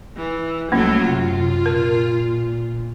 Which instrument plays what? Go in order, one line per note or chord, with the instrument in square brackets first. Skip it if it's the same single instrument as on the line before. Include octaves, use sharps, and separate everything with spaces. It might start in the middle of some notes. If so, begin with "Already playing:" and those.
[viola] E3
[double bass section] C2 [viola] F#3 A3 [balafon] A#3 C#4
[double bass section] F#2 C3 [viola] F4
[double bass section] A#2 [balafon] A#4